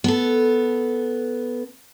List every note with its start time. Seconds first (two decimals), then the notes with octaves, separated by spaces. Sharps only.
0.04 B3 A4